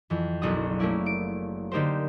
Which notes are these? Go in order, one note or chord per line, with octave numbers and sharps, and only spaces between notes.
F2 E3
F#1 B1 D4 F#4 D#6
A3 A#3 C#4 E4 D5
D7
D3 A#3 D#4 G4 A#4 C5